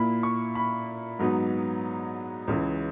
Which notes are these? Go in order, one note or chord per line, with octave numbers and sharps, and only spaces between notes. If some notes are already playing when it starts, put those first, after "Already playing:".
Already playing: A#2 A#3 E4 B5
C#6
B5
G#2 F#3 B3 D#4
C#2 C#3 E3